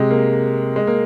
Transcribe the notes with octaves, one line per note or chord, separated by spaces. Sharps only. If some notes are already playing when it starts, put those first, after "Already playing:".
Already playing: C3 G#3
A#3
G#3
A#3